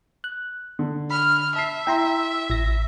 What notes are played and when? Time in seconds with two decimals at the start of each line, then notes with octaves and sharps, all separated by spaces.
0.24 F#6
0.79 D3
1.10 B5 F6
1.55 E5 A5 C7
1.87 E4 G5 A#5 C6
2.50 A1 A#6